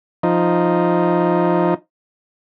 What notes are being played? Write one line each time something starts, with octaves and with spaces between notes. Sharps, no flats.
F3 D#4